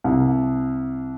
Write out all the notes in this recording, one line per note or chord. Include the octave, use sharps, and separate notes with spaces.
C2